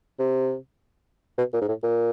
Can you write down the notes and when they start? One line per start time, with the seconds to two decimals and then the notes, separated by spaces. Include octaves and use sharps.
0.19 C3
1.38 B2
1.53 A#2
1.61 G#2
1.68 A2
1.83 A#2